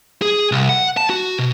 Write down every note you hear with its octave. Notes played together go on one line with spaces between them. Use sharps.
G#4
C2
F#5
A5
F#4
B2